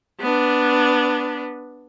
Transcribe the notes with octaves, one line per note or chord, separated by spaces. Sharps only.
B3 D4